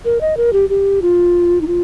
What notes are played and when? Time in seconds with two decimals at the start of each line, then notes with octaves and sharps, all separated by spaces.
0.05 A#4
0.21 D#5
0.37 A#4
0.53 G4
0.69 G4
1.02 F4
1.61 D#4
1.67 F4